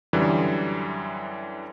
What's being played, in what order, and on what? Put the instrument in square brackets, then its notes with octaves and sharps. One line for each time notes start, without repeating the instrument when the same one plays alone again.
[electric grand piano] F#2 D3 E3 G3